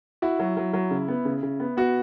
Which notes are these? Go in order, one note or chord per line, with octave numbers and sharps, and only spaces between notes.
E4 F#4
F#3
F#3
F#3
C#3
B3
C#3
C#3
B3
B3 F#4